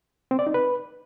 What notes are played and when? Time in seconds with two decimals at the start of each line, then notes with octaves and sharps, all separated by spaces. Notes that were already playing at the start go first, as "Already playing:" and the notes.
0.31 C4
0.39 D5
0.47 D#4
0.54 B4